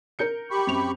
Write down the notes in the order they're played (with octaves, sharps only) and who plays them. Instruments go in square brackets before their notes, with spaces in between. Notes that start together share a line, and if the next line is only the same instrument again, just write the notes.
[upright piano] A#4 G6 C#7
[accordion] G4 B5 C#6
[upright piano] F#2 C4 F7